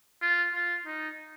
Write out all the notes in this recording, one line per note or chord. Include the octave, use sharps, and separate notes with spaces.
F4
F4
D#4